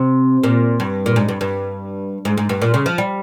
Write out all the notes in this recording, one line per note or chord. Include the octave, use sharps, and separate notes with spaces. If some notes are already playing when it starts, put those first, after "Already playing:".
Already playing: C3
A#2
G2
A#2
G#2
G2
G2
G#2
G#2
G2
A#2
C#3
F3
G3